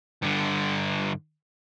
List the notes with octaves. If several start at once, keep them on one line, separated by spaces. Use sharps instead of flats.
G2 D3